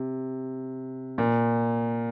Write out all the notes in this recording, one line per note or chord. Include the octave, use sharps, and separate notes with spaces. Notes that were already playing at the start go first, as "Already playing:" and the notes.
Already playing: C3
A#2